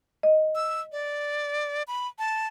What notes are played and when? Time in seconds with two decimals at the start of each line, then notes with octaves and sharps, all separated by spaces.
0.23 D#5
0.55 E6
0.92 D5
1.87 B5
2.19 A5